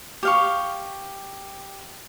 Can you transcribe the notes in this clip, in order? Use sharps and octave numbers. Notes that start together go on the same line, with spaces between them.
G4 F5 C#6